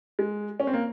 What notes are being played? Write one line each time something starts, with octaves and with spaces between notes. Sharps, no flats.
G#3
C#4
C4
A#3